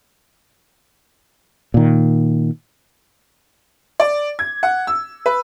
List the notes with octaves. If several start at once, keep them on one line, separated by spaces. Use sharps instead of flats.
A#2 D#3
D5
G#6
F#5
E6
B4